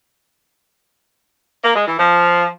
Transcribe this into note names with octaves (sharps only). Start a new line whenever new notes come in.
A#3
G#3
E3
F3